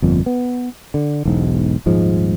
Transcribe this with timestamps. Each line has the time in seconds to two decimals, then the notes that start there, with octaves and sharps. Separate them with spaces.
0.02 G1 F2 A#2
0.26 B3
0.94 D3
1.25 E1 B1 G#2
1.86 D#1 G#2 F3 G#3